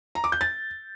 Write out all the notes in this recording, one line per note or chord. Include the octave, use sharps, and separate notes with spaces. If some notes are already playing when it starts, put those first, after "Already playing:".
A#5
D6
G6
A6